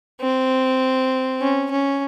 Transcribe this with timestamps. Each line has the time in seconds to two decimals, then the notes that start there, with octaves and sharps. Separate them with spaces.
0.21 C4
1.41 C#4
1.71 C#4